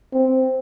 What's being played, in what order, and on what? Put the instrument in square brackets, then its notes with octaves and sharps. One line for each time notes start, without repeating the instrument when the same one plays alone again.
[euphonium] C4